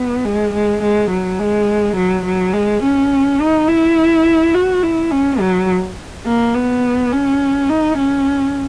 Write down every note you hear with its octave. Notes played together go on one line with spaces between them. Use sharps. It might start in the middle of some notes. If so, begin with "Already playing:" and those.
Already playing: B3
G#3
G#3
G#3
F#3
G#3
F#3
F#3
G#3
C#4
D#4
E4
F#4
E4
C#4
F#3
A#3
B3
C#4
D#4
C#4